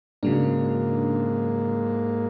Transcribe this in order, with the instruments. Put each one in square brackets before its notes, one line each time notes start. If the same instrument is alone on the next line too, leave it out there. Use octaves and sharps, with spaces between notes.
[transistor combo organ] G#2 A#3 [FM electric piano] C#3 F#3 D4